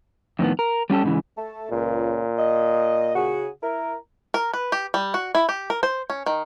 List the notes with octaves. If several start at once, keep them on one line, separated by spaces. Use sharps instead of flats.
F2 A2 D#3 B3
A#4
G3 C#4 G4 A4
G#2 C#3 E3
A3 A5
C#2 A#2
D#5
C#3 F#4 G#4
E4 A#4 A#5
A#4
B4
G4
G3
F#4
E4
G4
A#4
C5
C#4
D#3